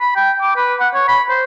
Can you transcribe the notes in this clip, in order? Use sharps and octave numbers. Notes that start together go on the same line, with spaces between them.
B5
G5
D6
B4
F#5
C#5
B5
C5